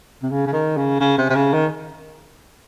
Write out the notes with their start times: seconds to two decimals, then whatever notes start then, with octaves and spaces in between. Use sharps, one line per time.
0.23 C3
0.30 C#3
0.47 C#3
0.53 D#3
0.77 C#3
1.00 C#3
1.18 C3
1.29 C3
1.35 C#3
1.53 D#3